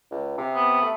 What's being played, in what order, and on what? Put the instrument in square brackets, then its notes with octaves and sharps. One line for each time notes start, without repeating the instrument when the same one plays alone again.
[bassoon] C#2
C3
[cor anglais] B3
[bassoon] A3